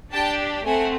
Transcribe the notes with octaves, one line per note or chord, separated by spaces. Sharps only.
D4 G4 G5 A5
A3 C4 F#5 G#5